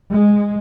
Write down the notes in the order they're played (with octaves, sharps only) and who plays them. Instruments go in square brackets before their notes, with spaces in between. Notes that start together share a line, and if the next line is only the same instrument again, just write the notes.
[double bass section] G#3